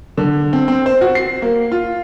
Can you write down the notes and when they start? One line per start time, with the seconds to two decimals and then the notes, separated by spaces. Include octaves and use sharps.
0.18 D3
0.53 C4
0.68 C4
0.86 C5
1.01 F#4
1.15 C7
1.42 A#3
1.72 F4